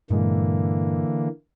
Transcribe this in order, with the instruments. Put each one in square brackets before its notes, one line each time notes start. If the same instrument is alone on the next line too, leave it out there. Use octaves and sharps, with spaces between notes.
[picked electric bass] G2 A#2 G#3 [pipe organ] D3 E3 A#3